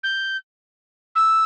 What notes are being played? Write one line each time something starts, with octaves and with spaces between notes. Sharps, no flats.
G6
E6